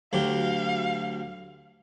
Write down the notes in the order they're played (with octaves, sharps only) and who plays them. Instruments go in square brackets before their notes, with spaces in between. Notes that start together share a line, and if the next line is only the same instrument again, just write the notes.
[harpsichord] D2 F#3 G4 [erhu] F5